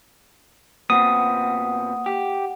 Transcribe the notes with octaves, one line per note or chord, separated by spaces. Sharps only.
A#2 B3 C4 F#5 D#6
G4